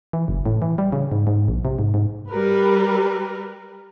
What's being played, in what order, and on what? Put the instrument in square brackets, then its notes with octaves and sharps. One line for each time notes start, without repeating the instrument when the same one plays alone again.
[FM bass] E3
F#1
A2
E3
G3
C#3
G#2
G#2
A#1
C3
G#2
G#2
[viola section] G3 A#4 B4